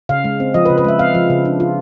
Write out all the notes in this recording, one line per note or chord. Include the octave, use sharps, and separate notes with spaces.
C#3 F5
G#3
C4
F3 D#5
B4
C#3
B4
G#3 E5
C4 F5
F3
C#3
D4
F4